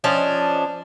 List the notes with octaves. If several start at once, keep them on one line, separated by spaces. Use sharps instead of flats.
F3 C#4 D4 D#5